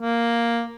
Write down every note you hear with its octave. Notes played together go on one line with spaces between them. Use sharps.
A#3